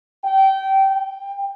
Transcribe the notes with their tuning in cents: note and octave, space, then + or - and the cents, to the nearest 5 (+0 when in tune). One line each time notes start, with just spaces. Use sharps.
G5 -20
G5 +20